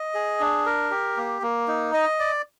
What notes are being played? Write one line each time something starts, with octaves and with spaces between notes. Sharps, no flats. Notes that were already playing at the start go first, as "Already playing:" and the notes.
Already playing: D#5
G#4
D4
A#4
G4
A#3
A#3
D#4
D#5
D5